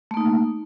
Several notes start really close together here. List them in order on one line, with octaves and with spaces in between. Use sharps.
A3 A#3 D#4